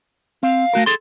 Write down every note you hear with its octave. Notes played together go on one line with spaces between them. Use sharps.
C4 F5
A3 F#4 A#4
G#4 A4 C6